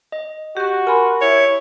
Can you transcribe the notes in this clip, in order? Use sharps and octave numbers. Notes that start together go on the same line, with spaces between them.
D#5
F#4 G4 C#6
A#4 G#5 B5 C6
E4 C#5